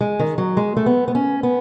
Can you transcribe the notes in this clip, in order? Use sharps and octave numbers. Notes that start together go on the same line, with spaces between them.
G#3
D#3
F#3
G#3
A3
B3
B3
C#4
B3